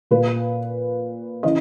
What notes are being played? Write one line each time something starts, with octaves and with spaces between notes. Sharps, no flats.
A#2 B4
C#3 E3 D#5